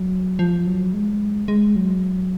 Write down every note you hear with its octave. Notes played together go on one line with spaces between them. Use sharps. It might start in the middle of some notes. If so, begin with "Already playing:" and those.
Already playing: F#3
F3
F#3
G#3
G#3
F#3